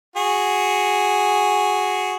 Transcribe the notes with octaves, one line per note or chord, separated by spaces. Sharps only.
F#4 G#4